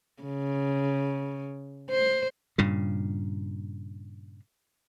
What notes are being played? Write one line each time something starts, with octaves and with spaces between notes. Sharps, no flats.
C#3
C5
G2 A#2 C#3